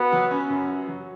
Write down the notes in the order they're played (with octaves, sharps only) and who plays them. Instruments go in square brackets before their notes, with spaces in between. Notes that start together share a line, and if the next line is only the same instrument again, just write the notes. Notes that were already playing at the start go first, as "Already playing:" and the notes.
Already playing: [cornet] B3 [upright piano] F#4
[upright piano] F#3
C#4
F#2
F#4
F#3